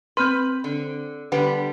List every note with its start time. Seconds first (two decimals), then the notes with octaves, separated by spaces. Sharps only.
0.17 C4 B4 C5 C6 F6 G6
0.64 D3
1.32 D3 G3 B3 G4 B4 F#5